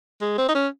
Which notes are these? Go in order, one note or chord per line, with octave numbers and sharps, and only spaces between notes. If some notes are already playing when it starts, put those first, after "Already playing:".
G#3
C4
D#4
C#4